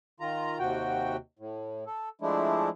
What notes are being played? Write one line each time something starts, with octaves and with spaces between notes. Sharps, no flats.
D#3 F4 A#5
D#2 C3 F#4 G5
A2
A4
F3 G#3 A3 D4 E4